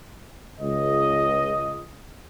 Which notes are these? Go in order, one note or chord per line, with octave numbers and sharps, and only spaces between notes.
C#2 D#5